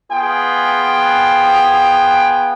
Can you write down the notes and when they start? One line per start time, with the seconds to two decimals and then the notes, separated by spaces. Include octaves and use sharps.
0.12 B3 F4 G#4 G5